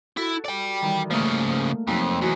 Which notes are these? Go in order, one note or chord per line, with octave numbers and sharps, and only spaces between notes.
E4 F#4 A4
D5 G5
D#3 E3 G3
C#3 F3 A3 A#3
F2 C3 F#3 D#4
E2 F#4 D#5